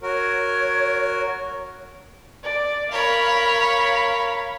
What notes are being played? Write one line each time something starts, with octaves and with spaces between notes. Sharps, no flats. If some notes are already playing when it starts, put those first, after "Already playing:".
F#4 A#4 C#5
D5
A#4 C#5 F5 B5